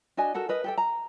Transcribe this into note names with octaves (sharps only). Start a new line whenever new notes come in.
D4 F#4 D#5 G#5
F#4 A4 A#4 F#5
A#4 B4 D#5
G4 A4 G5
A#5